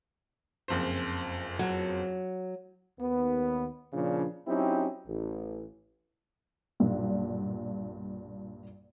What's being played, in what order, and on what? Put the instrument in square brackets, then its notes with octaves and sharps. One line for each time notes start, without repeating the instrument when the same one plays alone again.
[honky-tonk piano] F#1 F2 C5
[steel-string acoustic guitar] F#3
[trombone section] D#2 B3
A#2 C#3 F3 D4
F#3 C4 C#4 D#4 E4 G4
A1
[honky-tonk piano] B1 G2 A#2